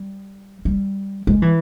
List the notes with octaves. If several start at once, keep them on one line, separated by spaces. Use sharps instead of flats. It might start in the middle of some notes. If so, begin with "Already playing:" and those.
Already playing: G3
G3
G#3
E3